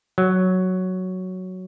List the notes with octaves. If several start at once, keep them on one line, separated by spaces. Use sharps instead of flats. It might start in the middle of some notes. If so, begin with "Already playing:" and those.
F#3